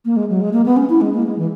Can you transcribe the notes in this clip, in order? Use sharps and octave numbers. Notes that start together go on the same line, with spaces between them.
A#3
G#3
F#3
G#3
A#3
B3
C#4
E4
G#3
A#3
G#3
E3